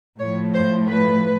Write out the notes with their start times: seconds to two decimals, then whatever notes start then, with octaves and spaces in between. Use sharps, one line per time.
0.19 A2 F3 A3 C#5
0.54 C5
0.88 B4